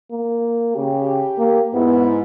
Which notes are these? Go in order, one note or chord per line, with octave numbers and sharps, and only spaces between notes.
A#3
C#3 G4
A#3
G#2 B3 E4